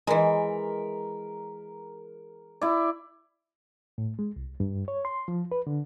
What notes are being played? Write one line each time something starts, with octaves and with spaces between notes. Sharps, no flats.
E3 G#3 A#4 B5
E4 D5
A2
G#3
C2
G2
C#5
C6
F3
B4
D3